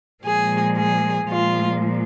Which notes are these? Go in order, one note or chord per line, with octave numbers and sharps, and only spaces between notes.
A#2 F3 G#3 G#4
G#4
A#2 F3 G#3 F4